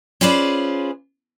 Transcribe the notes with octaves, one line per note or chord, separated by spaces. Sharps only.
C#4 F4 G#4 B4 C5 D5